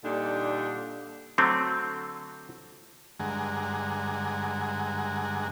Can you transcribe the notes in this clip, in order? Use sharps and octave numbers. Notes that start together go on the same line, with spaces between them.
A#2 D3 G3 D4 D#4
D3 F#3 A3 C4
G2 D3 G#3 F#5 G#5 A#5